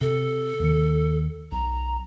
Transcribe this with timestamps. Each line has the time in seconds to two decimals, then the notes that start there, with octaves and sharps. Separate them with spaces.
0.01 C3 A4
0.60 D#2 D#3
1.52 B1 A#5